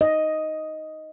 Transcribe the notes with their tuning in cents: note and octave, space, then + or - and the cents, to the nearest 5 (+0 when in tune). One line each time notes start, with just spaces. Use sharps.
D#5 +5